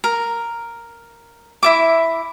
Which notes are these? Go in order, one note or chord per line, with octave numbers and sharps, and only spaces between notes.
A#4
E4 E5 D6